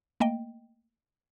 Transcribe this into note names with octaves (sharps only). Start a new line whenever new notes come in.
A3 A#3 D#5 G5